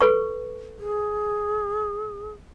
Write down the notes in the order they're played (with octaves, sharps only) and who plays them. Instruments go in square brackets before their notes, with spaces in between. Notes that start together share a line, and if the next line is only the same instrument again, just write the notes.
[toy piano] A4 B4 C#6
[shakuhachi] G#4